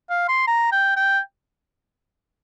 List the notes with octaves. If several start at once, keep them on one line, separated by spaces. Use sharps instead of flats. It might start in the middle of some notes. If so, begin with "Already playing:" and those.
F5
C6
A#5
G5
G5